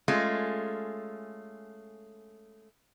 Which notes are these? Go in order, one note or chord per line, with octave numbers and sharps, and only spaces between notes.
G#3 A3 C#4 F4